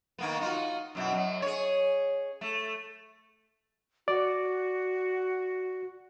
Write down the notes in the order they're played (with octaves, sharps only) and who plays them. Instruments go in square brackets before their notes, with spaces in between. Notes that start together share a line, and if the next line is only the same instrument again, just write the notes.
[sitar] D#3 A#3 B3
D#4 F4 F#4
F#2 B2 E4
F#2 F#3
G#4 C#5
A3
[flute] F#4 [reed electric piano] D5